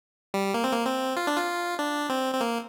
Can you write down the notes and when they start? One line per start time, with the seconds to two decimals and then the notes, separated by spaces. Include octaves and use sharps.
0.34 G3
0.54 A#3
0.64 C4
0.72 A#3
0.86 C4
1.17 F4
1.27 D4
1.37 F4
1.79 D4
2.09 C4
2.34 C4
2.41 A#3